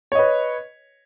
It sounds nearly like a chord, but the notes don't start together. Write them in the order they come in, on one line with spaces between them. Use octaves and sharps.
C#5 D#5 B4